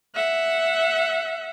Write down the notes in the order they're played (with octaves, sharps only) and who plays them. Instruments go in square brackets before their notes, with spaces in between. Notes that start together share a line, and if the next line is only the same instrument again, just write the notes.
[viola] E5 F#5